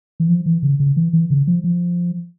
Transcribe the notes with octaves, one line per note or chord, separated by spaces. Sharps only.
E3
F3
E3
C#3
C#3
E3
E3
C#3
F3
F3